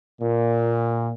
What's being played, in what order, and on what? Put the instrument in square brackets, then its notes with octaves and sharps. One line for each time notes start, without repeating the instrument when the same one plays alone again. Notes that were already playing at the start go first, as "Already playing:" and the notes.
[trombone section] A#2